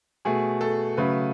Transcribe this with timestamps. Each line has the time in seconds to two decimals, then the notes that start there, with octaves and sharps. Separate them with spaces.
0.25 B2 A3 G#4
0.61 A4
0.97 C#3 F#3 A3 B4